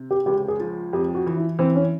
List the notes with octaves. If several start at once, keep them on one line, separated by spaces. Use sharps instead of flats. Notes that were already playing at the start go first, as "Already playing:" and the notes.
Already playing: C3
G4
C#2 G4
G#4
F3
F2 G4
F#4
E3
E4
E3 C4
C#4